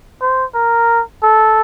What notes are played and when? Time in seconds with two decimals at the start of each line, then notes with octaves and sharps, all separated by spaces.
0.21 C5
0.55 A#4
1.23 A4